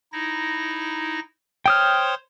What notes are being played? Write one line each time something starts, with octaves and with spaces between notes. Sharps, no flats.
D#4 E4 A#6
C5 C#5 G5 C6 D#6 F6